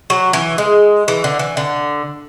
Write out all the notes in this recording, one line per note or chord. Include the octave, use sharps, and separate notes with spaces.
F#3
E3
G#3
E3
D3
E3
D3